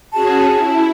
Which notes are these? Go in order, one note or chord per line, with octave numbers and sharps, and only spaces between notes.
C#4 F#4 G#4 A5
E4